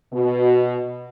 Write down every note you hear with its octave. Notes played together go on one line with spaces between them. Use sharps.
B2